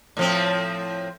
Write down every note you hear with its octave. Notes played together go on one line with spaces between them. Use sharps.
A2 F3 C4